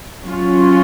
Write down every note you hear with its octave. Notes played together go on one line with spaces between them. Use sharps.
F#3 C#4 F4